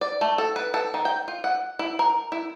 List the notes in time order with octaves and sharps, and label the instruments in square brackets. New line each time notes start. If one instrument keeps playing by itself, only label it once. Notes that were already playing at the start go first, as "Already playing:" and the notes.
[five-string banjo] D5
A3
A4
B4
A4
D#3
G5
F4
F#5
E4
A#4
E4